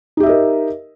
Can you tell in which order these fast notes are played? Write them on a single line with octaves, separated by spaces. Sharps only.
D#4 G4 E5 D#5 A#4